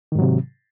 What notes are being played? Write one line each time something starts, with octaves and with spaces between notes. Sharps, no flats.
G#2 C3 D#3 F#3